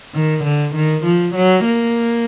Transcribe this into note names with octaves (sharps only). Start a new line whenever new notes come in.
D#3
D3
D#3
F3
F#3
A#3